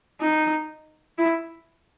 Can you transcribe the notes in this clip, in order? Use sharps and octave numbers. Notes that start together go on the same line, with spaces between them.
D#4
E4